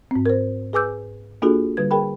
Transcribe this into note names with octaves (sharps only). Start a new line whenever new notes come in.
G#2 C4
A#4 C5
G#4 B4 G#5 D6 E6 G6
A#3 D4 F4 F#4 G#4 A4
D3 G3 B4 G#6
G#4 A#4 G5 B5